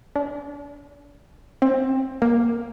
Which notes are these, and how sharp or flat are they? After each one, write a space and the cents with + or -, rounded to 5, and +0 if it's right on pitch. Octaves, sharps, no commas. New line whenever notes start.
D4 -30
C4 +25
A#3 +10